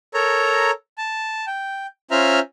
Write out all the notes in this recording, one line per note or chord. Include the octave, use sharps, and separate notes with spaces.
A4 A#4 C#5 A#5
A5
G5
C#4 F4 C5 E5 A#5 F6